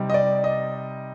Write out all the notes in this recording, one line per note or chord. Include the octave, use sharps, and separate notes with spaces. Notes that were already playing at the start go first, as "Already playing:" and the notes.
Already playing: C3 G3 C4 D#4
D#5
D5
D#5